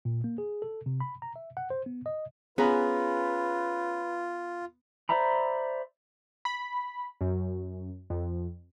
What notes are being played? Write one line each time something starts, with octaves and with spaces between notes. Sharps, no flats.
A#2
A#3
G#4
A4
C3
B5
A#5
E5
F#5
C5
B3
D#5
B3 C#4 F4 G#4 B4 A#5 B5
C5 D5 E5 A#5 B5
B5
F#2
F2